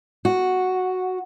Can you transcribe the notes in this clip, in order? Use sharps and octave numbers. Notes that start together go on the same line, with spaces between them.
F#4